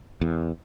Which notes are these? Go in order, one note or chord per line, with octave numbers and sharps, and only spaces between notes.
E2